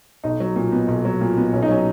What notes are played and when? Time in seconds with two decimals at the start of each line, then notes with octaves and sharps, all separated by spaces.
0.24 B1 D#4
0.40 F#3
0.56 A#2
0.72 B3
0.88 B1
1.05 F#3
1.21 A#2
1.38 B3
1.53 B1 C#4
1.62 D#4
1.70 F#3 C#4